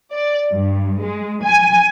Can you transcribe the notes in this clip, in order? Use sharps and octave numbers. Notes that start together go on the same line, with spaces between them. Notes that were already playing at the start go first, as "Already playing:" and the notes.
D5
G2
G#3
G#5